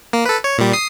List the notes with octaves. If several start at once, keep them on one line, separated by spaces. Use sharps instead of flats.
A#3
A4 B4
C#5
A#2 G3
D#6 C7